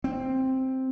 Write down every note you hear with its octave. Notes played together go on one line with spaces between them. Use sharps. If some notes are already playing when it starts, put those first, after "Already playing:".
C4